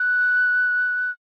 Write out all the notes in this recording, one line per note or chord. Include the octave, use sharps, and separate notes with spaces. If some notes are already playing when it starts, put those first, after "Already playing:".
Already playing: F#6